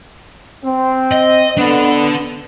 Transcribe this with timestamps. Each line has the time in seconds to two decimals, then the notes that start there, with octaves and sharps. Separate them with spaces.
0.64 C4
1.11 D#5
1.57 B3 D4 A4